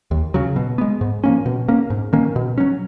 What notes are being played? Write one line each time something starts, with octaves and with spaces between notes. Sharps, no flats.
D#2
C#3 F#3
B2
G#3 B3
G#2
F3 A#3 C#4
B2
A#3 C#4
G#2
D#3 A#3 C#4
B2
F#3 C#4